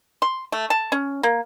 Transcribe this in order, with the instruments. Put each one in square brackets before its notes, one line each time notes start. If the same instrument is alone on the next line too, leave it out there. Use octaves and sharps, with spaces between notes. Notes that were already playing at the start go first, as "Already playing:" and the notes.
[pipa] C6
A3
A5
C#4
A#3